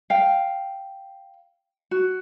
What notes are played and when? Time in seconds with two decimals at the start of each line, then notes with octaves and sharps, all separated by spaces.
0.10 F5 G5
1.91 F#4